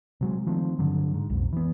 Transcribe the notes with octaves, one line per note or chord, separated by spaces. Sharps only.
C3 F#3 G#3
D#3 F3 A3 C4
G2 D3 F#3
G#2
B1 F2
E3 B3